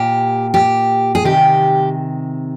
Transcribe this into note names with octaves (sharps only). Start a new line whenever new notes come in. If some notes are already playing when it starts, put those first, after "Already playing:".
Already playing: A#2 G4
G4
G#4
C3 D#3 G4